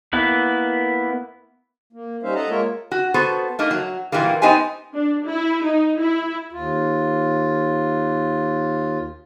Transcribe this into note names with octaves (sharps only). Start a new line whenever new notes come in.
A#3 B3 E4 B4
A#3
G3 C#4 D#4 C5 E5 F5
A4 D#5 E5 F#5 A5 A#5
G#3 A#3 F4 A#4 C#5 E5
F#4
B3 F#4 A4 C5
A3 A#3 D#4
F#3
A#2 E3 F#3 G3 A#3
B3 D#4 G4 C5 G#5
D4
E4
D#4
E4
D#2 F4